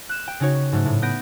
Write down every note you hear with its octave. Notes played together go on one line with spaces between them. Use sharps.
F#6 E7
G5
C#3 C#4 D#4 F#4 C#5
G#2 F#3 A3
A2
B3 G6 A#6 D7